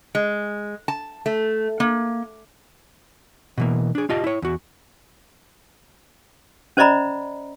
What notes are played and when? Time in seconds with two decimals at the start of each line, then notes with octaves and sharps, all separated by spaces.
0.15 G#3
0.88 A5
1.26 A3
1.80 A#3
3.58 B2 E3 A#3
3.95 D4 G#4
4.09 F4 G4 D#5 A5
4.24 E4 C#5
4.42 E2 F#4
6.77 C#4 C5 D5 D#5 A#5 B5